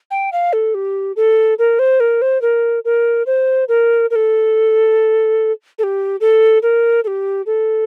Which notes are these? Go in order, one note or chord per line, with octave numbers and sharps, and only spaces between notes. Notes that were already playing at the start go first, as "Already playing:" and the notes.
G5
F5
A4
G4
A4
A#4
C5
A#4
C5
A#4
A#4
C5
A#4
A#4
A4
A4
G4
A4
A#4
A4
G4
A4